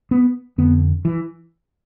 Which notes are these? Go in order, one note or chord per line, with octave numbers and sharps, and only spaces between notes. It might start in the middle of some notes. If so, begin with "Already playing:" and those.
B3
F2 D3 B3
E3